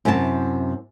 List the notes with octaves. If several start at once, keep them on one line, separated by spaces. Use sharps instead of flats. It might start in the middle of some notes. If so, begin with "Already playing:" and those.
F#2 C3 E4 A4 A5